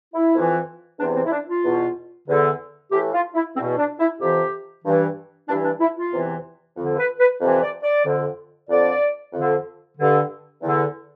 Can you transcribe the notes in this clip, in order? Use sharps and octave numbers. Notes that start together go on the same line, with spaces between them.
E4
F2 E3
E2 C3 E3 D4
C4
E4
D4
F4
E2 B2
E2 D3
A2 E3 G4
F4
E4
E2 B2 C4
D4
E4
F2 C3 E3 G4
G2 E3
G2 E3 D4
D4
E4
F4
E2 C3 E3
F2 D3
B4
B4
F2 C3 E3
D5
D5
F2 D3
F2 D3 D5
F2 D3
G2 D3
E2 D3